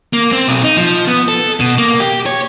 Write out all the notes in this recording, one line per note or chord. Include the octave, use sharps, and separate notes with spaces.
A#3
C4
B1
D#4
F3
B3
A4
B2
A#3
G4
C#5